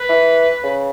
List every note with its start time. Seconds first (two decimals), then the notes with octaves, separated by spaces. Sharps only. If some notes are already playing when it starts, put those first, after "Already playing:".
Already playing: B4
0.09 E3
0.64 C#3